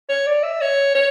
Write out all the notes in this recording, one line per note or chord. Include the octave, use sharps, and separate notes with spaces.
C#5
D5
E5
C#5
C#5